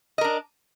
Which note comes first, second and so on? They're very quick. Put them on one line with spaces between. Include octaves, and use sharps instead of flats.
D#5 A#4 D4